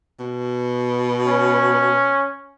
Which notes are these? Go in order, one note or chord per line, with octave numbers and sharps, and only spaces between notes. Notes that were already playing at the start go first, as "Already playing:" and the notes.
B2
C#4